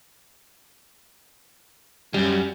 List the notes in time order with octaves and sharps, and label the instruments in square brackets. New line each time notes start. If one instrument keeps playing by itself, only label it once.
[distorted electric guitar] F#2 [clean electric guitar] G3 C#4